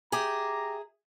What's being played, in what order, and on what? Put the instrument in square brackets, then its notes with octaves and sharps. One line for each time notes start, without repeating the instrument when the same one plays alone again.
[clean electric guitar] G4 [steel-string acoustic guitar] G#4 E5 [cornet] A#5